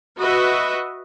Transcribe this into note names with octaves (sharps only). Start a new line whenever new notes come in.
F#4 B4 D#5 E5